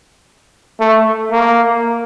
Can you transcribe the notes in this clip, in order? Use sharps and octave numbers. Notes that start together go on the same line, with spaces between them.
A3
A#3